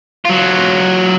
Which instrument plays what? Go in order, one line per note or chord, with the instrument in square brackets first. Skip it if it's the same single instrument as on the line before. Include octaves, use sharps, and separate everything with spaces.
[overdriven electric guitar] F#3 F4